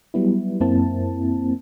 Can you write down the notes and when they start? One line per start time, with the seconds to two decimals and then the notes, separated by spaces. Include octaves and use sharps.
0.14 F#3 G3 B3 E4
0.60 F#2 A#3 C4 E4 A5